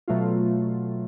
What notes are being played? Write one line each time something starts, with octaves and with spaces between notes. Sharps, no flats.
B2 F#3 A3 F4